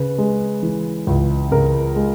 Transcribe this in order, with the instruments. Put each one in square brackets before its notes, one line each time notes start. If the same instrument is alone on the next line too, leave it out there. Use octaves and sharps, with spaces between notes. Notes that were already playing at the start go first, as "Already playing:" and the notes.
Already playing: [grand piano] C#3 B4
G#3
E3
C#2
C#3 A#4
G#3